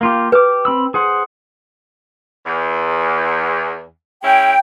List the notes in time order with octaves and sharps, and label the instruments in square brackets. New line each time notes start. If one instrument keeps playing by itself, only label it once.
[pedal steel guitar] A#3 F4 G4
[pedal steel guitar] G4 D6 [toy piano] B4
[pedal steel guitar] C4 B5 E6
G#4 C5 F#5
[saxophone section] E2
[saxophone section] G#3 C#4 E4 [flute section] G5